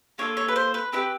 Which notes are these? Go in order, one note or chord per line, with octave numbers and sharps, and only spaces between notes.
A#3 D4 F4 A4 C#5
C#5
B4
C5
B4
C4 E4 G4 B4